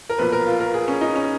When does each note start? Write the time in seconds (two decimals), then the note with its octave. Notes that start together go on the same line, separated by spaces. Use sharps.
0.10 A#4
0.18 B1 A#2 F3 B4
0.32 A#4
0.47 F4
0.60 A#4
0.74 G#4
0.88 C#4
1.01 D#4
1.16 C#4